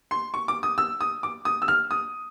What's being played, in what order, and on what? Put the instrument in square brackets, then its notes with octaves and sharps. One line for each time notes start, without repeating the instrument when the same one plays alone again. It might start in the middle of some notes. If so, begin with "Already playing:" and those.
[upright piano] C6
C#6
D6
D#6
E6
D#6
D6
D#6
E6
F6
D#6